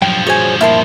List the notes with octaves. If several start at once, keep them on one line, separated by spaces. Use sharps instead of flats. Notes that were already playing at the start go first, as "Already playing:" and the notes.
G2 F3 F#3 G5
F#4 G#4 C5 C#5 G#5
A#3 E4 A#4 A5 C6